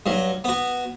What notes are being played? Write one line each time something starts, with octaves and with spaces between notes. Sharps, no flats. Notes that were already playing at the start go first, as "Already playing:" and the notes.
G2 F#3
B3 F#4